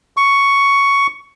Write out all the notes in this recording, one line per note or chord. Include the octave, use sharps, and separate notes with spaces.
C#6